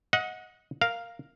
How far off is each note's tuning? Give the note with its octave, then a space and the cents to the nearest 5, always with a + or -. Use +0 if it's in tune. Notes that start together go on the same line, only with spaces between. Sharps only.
D#5 +25 F#5 -20
A#4 +0 F5 +0